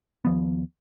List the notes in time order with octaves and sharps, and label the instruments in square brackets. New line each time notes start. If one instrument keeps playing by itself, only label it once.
[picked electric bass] D#2 F3 B3